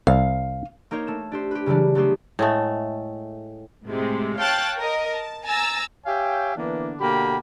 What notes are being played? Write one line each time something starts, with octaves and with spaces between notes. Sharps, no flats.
C2 F5
A#3 D#4 A#4 C5 C#5
A3 E7
D4 G4 C5
G4 B4
C#3 E3 F#3 G3 D4
F#3 A3 B3 G4 G#4 C5
A2 G#3 A3
A2 C3 G#3
C#5 F5 G5 A5 F#6 A6
A#4 D#5
A5
G#5 A#5 E6 A6
G4 C#5 E5 F5 G5 G#5
D3 E3 A#3 B3 D4
B2 D3 A#3 G4 G5 B5